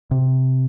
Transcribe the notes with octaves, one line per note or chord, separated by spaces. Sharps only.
C3